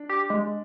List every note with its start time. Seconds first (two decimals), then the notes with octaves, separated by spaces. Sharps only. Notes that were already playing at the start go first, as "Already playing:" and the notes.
Already playing: D4
0.09 G4
0.30 G#3